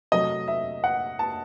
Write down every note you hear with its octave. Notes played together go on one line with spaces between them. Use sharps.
C3 F#3 A3 D#5
E5
F#5
A5